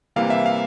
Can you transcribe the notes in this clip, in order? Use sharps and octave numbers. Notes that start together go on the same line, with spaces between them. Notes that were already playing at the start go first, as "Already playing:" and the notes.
C3 E3 G3 A#3 F5
E5
F5